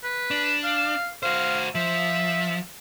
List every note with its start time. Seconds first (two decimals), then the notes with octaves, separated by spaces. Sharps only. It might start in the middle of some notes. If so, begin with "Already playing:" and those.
0.03 B4
0.31 D4
0.64 F5
1.23 F#4 C5 F5
1.75 F3 E5